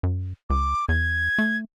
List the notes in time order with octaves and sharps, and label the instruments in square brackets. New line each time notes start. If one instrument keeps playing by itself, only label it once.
[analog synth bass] F#2
[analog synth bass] C#2 [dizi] D6
[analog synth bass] E2 [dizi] G#6
[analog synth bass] A3